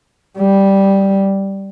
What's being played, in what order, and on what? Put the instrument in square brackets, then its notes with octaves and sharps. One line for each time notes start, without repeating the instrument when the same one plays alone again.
[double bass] G3